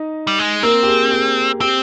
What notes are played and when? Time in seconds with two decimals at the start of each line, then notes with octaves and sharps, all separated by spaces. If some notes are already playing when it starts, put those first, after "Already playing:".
Already playing: D#4 D#5
0.27 G3
0.39 G#3
0.63 A#3 C4 A#4
0.83 G4
0.88 G#4
1.12 G#4
1.61 C4 G4